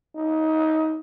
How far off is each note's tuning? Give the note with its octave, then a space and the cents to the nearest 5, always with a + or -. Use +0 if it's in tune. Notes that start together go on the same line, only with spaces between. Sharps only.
D#4 +20